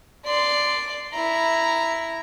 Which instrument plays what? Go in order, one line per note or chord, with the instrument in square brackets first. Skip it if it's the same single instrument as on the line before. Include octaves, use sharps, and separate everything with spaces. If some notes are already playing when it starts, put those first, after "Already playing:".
[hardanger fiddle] D5 C6
E4 A#5